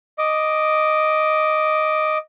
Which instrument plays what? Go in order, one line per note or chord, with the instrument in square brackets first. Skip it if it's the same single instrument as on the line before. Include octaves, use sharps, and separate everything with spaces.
[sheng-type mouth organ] D#5 D6